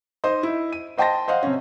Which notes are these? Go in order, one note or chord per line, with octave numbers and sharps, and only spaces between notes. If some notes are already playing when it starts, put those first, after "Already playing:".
D#4 C5 D#5
E4
D#7
C5 D#5 G5 A5 C6 A#6
C5 D#5 F5 F#5
C3 C4 C#4